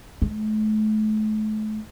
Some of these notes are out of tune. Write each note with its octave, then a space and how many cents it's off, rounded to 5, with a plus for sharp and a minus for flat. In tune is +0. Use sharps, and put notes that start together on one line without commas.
A3 -35